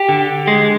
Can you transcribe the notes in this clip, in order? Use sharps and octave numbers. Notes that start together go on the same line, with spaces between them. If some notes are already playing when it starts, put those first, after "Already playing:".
Already playing: G4
D3
G#3